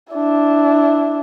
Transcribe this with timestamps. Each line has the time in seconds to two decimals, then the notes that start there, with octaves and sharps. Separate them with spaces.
0.13 D4 E4